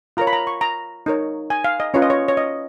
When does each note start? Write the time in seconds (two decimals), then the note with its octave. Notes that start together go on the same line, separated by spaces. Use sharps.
0.17 F4 A#4 C#5 A#5
0.27 B5
0.33 A#5
0.47 C#6
0.61 A#5
1.06 D#4 A#4 C#5
1.50 G#5
1.64 F5
1.80 D#5
1.94 C#4 F4 B4 C#5
2.02 D#5
2.10 C#5
2.28 C#5
2.37 D#5